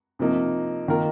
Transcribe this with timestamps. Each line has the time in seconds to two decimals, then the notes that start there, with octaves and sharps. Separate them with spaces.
0.19 C3 F3 A#3 D#4
0.88 D#3 A#3 F4 A#4